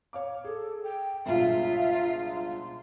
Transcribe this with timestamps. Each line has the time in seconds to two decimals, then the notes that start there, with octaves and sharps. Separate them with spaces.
0.13 C#5 F5 D6
0.45 G#4 A4
0.84 G5
1.26 G1 C#2 B2 F4 E5
2.31 C6